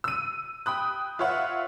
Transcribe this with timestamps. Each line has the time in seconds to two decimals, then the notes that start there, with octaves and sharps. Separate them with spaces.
0.04 E6 D#7
0.66 G5 B5 D#6 F#6
1.19 F4 B4 C#5 E5 F#5